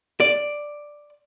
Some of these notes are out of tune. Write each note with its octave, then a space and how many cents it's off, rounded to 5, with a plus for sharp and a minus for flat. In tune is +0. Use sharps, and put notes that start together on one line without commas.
D5 +5